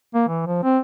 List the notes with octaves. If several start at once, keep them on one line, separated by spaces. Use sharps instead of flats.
A#3
E3
F3
C4